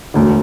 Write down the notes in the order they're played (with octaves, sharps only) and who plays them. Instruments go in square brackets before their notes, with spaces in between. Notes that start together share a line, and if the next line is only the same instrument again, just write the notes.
[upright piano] E1 D2 D3